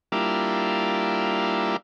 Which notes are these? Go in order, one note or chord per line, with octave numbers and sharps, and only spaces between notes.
G3 A#3 D4 E4 F4